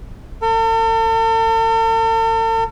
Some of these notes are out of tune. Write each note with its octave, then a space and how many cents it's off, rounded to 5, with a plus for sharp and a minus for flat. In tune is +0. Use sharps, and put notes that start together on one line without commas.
A4 +45